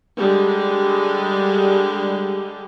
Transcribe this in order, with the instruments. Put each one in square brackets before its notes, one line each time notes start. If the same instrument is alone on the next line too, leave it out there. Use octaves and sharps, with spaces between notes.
[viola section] D3 G3 G#3